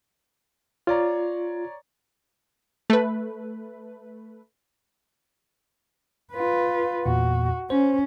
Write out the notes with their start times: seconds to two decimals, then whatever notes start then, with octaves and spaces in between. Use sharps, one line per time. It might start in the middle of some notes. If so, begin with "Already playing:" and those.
0.87 F4 C#5 D5 A#5
2.90 A3 B4
6.33 F4 B4
7.06 E2 A#2 F#4
7.70 C#4 C5